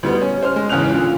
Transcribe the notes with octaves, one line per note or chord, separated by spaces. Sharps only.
D2 G3 B3
C#4
C5 F6
G#3
E2 G#2 C#3 F6 F#6 F7
A#2 D3